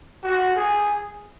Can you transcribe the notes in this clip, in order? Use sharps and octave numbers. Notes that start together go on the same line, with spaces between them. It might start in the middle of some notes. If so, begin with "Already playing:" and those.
F#4
G#4